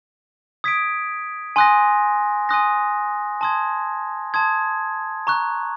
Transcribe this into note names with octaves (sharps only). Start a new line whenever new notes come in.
D#6 G#6 B6 D7
G#5 C6 D#6 F#6 A#6
G#5 C6 D#6 F#6 A#6
A5 C6 D#6 G#6
A5 C6 D#6 G#6
A#5 C#6 F#6